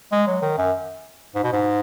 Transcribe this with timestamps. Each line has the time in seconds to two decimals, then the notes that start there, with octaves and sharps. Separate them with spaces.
0.12 G#3
0.27 F#3
0.42 D#3
0.58 F#2
1.36 G#2
1.44 B2
1.53 G#2